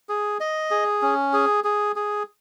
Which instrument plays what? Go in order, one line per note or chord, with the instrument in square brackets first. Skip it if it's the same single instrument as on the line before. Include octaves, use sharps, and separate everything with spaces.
[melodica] G#4
D#5
G#4
C#4
G#4
G#4
G#4